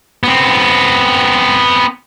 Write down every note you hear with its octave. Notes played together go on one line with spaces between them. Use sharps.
B3 C4